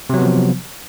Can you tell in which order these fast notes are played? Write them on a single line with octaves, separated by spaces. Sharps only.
C3 F#3 B3 F3